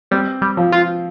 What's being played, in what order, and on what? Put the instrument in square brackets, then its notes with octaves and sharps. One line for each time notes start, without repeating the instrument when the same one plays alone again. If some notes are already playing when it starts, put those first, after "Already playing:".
[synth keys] G3 [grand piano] C4
[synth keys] G3
[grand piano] F3
[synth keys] F4